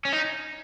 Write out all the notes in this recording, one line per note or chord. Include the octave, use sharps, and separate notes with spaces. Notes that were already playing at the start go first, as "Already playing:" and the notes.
C#4
D#4